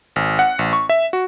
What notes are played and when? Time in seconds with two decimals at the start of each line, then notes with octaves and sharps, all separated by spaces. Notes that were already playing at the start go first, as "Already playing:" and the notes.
0.16 G#1
0.39 F#5
0.59 A1
0.73 C#6
0.89 E5
1.13 F#4